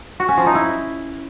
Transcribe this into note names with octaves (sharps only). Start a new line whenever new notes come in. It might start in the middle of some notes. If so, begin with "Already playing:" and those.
F#4
C#4
F3
D#4
E4